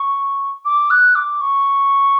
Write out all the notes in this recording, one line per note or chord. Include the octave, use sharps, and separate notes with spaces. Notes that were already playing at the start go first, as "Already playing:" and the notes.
Already playing: C#6
D6
F#6
D6
C#6